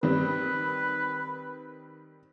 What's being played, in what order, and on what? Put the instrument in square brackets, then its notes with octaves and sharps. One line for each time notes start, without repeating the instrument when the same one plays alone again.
[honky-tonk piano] D#3 G3 C4 [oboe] B4